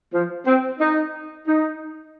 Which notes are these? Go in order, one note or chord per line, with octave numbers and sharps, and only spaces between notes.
F3
C4
D#4
D#4